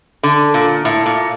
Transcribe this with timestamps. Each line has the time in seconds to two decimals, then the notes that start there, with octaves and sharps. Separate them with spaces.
0.23 D3
0.54 A#2
0.85 A2
1.06 A#2